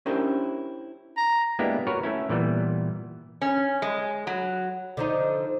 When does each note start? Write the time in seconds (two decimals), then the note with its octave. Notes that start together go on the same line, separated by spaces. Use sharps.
0.06 C#4 D4 E4 G4 A#4 C5
1.17 A#5
1.59 G#3 A#3 B3 D4 E4 G4
1.87 F#4 A#4 B4 C#5
2.03 A3 C#4 E4
2.30 A#2 E3 G3 B3
3.42 C#4
3.82 G#3
4.27 F#3
4.97 D3 F3 D#4